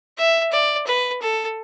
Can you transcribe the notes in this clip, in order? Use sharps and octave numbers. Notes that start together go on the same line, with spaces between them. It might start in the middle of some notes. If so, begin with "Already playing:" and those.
E5
D5
B4
A4